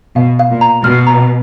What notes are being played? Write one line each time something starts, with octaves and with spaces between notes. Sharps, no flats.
B2 F5
F5
A#2
A#5
B2 F6
A#5